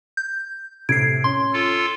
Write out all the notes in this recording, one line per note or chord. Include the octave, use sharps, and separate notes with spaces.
G6
A2 C3 G#6 C7 D7
C#4 C6
F4 A4